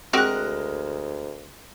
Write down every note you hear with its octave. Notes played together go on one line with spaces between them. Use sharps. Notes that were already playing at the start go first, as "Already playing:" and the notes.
D2 G#3 C4 F#4 G4 A#4 F#6